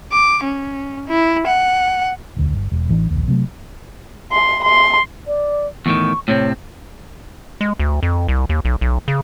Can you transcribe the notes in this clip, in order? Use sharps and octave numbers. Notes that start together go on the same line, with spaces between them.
D6
C#4
E4
F#5
E1 D2
G1
E1
A1 E3 G3 D4
A#1 D#2
C3 F#3 A3
C6
C6
D5
E2 A2 D#3 C#6
A2 C3 C4 C#5
G#3
D2
F2
C2
D#2
B1
B1
C#3